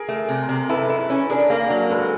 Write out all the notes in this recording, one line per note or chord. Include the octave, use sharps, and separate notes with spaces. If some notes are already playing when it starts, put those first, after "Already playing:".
Already playing: G#4 A#4
A3
C3
C3
E4 A4 B4
E4
C#4
D4 G#4 A#4
A#3
F#3
G#3 A4 B4